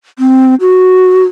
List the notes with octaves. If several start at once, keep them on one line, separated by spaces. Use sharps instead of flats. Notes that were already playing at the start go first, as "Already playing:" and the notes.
C4
F#4